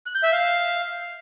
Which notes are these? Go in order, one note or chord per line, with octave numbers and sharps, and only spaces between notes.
F#6
G6
E5
F5